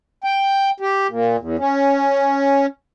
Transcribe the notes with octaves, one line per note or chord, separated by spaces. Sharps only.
G5
G4
A#2
E2
C#4